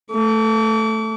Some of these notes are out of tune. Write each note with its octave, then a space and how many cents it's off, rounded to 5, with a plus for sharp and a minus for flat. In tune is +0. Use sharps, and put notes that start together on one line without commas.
A3 +0 D6 -40